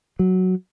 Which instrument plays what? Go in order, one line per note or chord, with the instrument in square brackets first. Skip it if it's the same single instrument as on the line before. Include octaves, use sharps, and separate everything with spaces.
[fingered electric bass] F#3